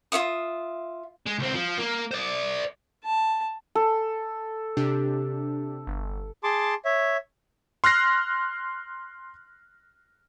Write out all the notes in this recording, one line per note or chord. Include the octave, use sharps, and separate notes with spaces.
F4 C#5 E5 D#6
G#3
C#2 C4
F3
A#3
C5 D5
A5
A4
C3 D4 G4
G1
G#4 A5 C6 D6
C#5 E5
C6 F6 F#6 A#6 C7